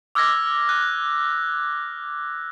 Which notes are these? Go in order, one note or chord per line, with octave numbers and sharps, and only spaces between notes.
D6 E6 F6 G#6 A#6
F#6